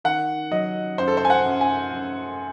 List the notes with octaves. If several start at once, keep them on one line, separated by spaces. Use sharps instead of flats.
D#3 F#5
F#3 D#5
F#2 C5
A4
C5
G#5
F#5
F#2
G#5
F#2